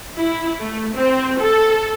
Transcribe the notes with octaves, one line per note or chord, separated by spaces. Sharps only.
E4
A3
C4
A4